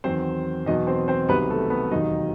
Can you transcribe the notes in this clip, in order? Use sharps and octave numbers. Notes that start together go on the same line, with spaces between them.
E2 D#3 F#3 C4 C5
E2 B2 F#3 D#4 D#5
C4 C5
C4 C5
C2 C3 D#3 F#3 B3 B4
A3 A4
B3 B4
E1 D#2 D#3 F#3 D#4 D#5